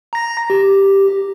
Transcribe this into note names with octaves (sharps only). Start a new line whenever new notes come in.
A#5 A#6
G4